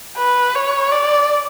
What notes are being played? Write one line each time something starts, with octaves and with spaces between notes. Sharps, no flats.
B4
C#5
D5